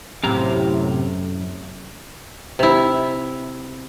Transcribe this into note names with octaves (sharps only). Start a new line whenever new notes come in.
F#2 A2 C3 F5 A#5
C3 E4